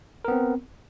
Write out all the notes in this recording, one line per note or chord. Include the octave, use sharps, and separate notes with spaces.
B3 C4 A#4